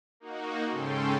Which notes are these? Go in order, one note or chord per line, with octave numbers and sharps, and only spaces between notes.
A#3 D#4 F#4
G#2 C#3 C#4 A4 G5 C6